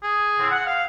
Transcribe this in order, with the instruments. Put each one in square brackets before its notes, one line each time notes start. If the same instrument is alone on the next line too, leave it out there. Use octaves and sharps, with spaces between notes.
[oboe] G#4
[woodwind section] A2 D3 C4
F#5
F5